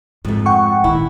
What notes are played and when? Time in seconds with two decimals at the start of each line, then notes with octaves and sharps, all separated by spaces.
0.25 F2 G#2 F3 A3
0.46 F#5 G5 C#6
0.84 A#2 D#3 E4